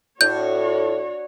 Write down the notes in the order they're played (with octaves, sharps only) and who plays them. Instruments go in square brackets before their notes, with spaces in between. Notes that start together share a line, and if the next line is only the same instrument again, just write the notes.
[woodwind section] A2 [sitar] D4 [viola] F#4 C#5 [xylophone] G6